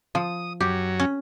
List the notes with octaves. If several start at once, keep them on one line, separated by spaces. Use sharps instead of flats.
F3 D#6
F#2 F#3 G4
C#4